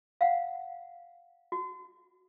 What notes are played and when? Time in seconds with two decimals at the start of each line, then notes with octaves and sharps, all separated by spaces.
0.21 F5 F#5
1.52 F#4